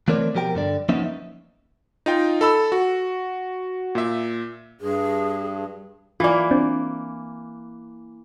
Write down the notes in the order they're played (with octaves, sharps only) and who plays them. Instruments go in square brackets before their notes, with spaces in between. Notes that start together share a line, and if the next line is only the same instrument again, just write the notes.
[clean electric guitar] E3 A3 C4 A#4 C#5 D5
B2 F3 G4 A#4 G5
G2 D3 D5
F3 A#3 B3 C#4 D#4 E5
[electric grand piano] D#4 F4 G5
A4 B5 E6
F#4
A#2 E5
[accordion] G2 [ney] G#4
[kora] E3 A#3 [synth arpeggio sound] F4 D5
[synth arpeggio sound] C4 D4